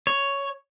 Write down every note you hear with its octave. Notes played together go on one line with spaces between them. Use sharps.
C#5